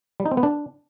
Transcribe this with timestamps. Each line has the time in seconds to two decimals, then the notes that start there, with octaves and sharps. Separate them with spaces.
0.20 G3
0.26 D#4
0.31 C4
0.37 B3
0.43 D4